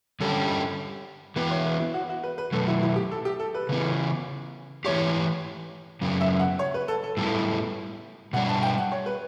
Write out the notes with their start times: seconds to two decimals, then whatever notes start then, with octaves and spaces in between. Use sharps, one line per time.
0.21 D3 G3 C#4 G4 A4
1.36 E3 B3 F#4 B4
1.51 C#5
1.66 B4
1.80 E4
1.94 F#4
2.09 F#4
2.23 B4
2.38 B4
2.52 B2 F#3 A3 A4
2.68 E4
2.82 E4
2.96 G4
3.11 A4
3.25 G4
3.39 A4
3.54 B4
3.69 C#3 E3 B3
4.85 E3 A3 E4 G4 C#5
6.01 F#2 C#3 F#3 B3
6.21 E5
6.39 F#5
6.59 C#5
6.74 B4
6.88 A4
7.04 A4
7.17 A2 G3 B3 E4 A4
8.33 B2 G3 D4 F#5
8.49 A5
8.63 G5
8.78 F#5
8.92 C#5
9.06 B4